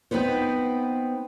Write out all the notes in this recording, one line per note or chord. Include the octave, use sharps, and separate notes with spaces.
B3 C4 D#4 B4 C5